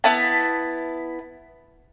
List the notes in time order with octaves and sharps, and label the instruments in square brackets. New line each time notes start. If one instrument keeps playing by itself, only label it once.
[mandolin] B3 E4 A5